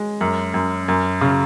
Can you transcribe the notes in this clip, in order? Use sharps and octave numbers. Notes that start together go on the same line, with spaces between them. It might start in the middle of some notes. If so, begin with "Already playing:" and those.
Already playing: G#3
F#2
F#2
F#2
C#3